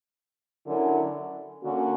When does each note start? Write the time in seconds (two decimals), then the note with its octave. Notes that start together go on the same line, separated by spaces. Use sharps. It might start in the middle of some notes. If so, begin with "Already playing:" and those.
0.66 D3 F#3 C#4 E4 A#4
1.62 D3 A#3 C#4 F#4